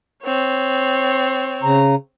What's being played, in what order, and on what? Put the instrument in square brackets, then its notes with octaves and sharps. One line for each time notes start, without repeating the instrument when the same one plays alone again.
[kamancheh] C4 C#5
[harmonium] C#3 A#5